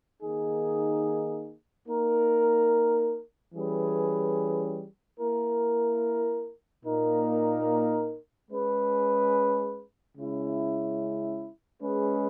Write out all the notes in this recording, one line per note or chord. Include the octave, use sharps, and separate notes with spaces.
D#3 A#3 D#4 G#4
A#3 D#4 A#4
E3 G3 C#4 G#4 B4
A#3 E4 A#4
A#2 A#3 D#4 A#4
G#3 C#4 G#4 B4
C#3 G#3 C#4 E4
G#3 C#4 G#4 B4